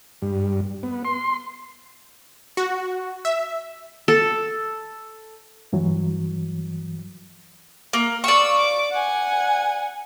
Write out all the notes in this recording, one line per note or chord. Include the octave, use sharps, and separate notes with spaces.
G2
B3
C6
F#4
E5
A4
G2 E3 F#3
A#3
D5 F5 C#6 E6
D6
F#5 G#5